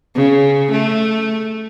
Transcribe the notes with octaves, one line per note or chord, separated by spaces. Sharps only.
C#3
A3